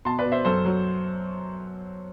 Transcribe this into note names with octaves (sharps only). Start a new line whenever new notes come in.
B2 A5 C6
B4 D5
B2
C5 E5
F#2 A4 C5
F#3